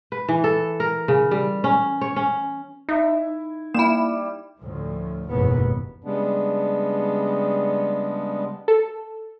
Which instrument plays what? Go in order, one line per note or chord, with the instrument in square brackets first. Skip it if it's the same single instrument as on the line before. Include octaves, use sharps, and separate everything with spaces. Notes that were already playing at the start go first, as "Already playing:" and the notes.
[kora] B4
E3
A4
A#4
C#3
G3
C#4
C#5
C#4
[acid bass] D#4 [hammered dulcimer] E4
[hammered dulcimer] G3 [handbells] A#3 [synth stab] E4 E7
[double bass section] D2 A2 F3
F#1 D#2 G#2 B2 E3 B3
[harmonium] C#3 G3 G#3 B3 D4
[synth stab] A4